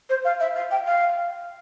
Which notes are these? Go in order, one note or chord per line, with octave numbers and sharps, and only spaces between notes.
C5
F5
E5
F5
G5
F5